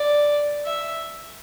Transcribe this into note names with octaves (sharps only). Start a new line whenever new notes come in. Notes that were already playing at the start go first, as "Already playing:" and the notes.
Already playing: D5
E5